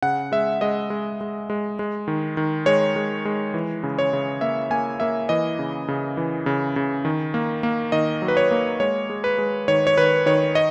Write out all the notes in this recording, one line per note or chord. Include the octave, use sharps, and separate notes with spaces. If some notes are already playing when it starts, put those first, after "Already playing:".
C#3 F#5
G#3 E5
G#3 D#5
G#3
G#3
G#3
G#3
D#3
D#3
G#3 C#5
G#3
G#3
E3
C#3
C#5
C#3
A#3 E5
A#3 G#5
A#3 E5
E3 D#5
C#3
C#3
E3
C#3
C#3
D#3
A#3
A#3
D#3 D#5
F#3
B4
C#5
A#3
G#3 C#5
G#3
B4
G#3
D#3 C#5
C#5
D#3 B4
D#3 C#5
D#5